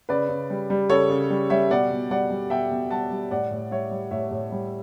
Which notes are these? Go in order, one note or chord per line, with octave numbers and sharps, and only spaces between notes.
C#3 B4 D5
C#3
G3
G3
C#3 A4 C#5
C#3
G3
G3 C#5 E5
B2 D5 F#5
B2
G3 D5 F#5
G3
B2 E5 G5
B2
G3 F#5 A5
G3
A2 D5 F#5
A2
G3 C#5 E5
G3
A2 C#5 E5
A2
G3